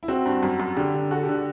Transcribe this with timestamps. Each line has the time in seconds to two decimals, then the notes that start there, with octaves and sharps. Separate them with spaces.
0.03 E4
0.08 C4 F#4
0.25 G2
0.43 F#2
0.60 F#2
0.76 D3 G4
0.94 D3
1.11 F#4 A4
1.23 G4
1.29 D3
1.35 G4